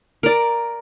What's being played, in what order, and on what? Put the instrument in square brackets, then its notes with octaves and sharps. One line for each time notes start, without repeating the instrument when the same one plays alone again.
[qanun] A#4 D5